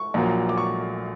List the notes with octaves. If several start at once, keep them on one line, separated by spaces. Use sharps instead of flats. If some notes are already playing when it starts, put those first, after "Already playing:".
Already playing: C#6
A#1 A#2 F#3 A#3
D6
C#6